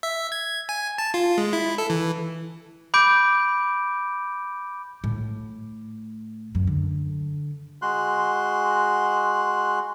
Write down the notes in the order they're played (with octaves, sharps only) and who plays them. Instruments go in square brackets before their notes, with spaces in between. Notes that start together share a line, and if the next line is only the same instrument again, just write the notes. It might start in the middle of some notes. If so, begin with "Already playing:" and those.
[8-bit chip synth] E5
G#6
G#5
A5
F4
G#3
E4
A4
E3
[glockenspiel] B5 D6 G6 D7
[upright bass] A2
F#2
D3
[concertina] G#3 F#4 C6 F#6